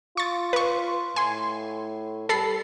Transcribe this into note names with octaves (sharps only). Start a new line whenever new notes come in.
F4 C#6 A6
B4 C#6
A2 G#5 C6
G3 A4 B5 C7